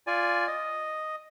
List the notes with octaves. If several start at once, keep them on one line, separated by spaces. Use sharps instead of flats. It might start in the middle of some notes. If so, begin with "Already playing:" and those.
F4 D5 G#5
D#5